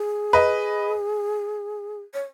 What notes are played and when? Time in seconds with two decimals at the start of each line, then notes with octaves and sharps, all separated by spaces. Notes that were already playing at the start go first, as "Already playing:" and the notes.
Already playing: G#4
0.33 B4 D#5
2.14 C#5